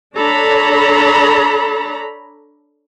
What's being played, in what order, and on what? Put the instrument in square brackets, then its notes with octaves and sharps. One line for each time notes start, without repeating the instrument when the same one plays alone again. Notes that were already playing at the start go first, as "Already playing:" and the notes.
[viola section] D4 A4 C#5 A#5 B5